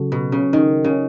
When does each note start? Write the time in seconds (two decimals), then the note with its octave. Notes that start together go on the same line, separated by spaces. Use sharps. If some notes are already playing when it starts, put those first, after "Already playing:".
Already playing: C#3 F#3 C#4 F#4 A4
0.12 B2
0.32 C#3
0.53 D#3 C#4 G#4 D#5
0.84 C#3